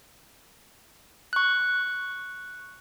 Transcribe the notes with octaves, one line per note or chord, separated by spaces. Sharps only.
C#6 F#6